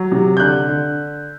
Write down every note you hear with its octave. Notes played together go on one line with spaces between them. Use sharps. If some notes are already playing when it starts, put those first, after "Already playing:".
Already playing: F#3
C3
G6
D3 F#6
D3